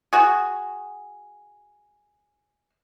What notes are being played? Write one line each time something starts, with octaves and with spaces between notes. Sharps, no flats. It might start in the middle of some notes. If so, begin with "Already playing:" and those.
F#4 G#4